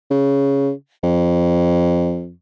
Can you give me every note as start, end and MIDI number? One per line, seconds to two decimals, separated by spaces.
0.11 0.71 49
1.04 2.31 41